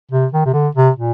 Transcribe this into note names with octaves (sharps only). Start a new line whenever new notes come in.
C3
D#3
C3
D3
C3
A#2